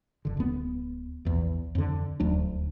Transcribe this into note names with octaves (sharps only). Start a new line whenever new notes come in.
F#1 D3
D1 B3
A#1 E2
F2 D3
D#1 D2 F#3 D4